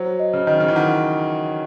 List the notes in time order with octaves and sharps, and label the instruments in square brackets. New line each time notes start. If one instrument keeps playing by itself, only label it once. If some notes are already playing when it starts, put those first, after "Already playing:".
Already playing: [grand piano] F#3 [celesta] C5
[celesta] D#5
[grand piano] C#3
[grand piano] D#3 [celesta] D#5
[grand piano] C#3
E3
[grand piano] D#3 [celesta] F#5